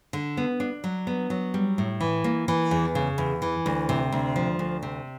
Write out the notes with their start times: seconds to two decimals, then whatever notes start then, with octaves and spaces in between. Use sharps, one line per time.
0.13 D3
0.37 B3
0.60 D4
0.84 F#3
1.07 B3
1.30 F#3
1.54 G3
1.78 A2
2.00 E3
2.24 A#3
2.48 E3
2.71 E2
2.95 C#3
3.18 E2
3.42 E3
3.66 D2
3.89 C3
4.12 D2
4.36 F3
4.59 D2
4.83 C3